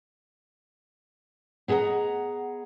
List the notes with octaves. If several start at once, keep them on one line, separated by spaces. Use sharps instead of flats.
B3 G#4 D#5 F#5 A#5